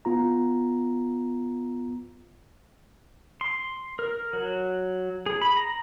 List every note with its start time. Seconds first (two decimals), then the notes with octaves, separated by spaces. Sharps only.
0.05 B3 F4 A#5
3.41 C6
3.99 A#4
4.33 F#3
5.26 G#4
5.42 B5
5.57 A#5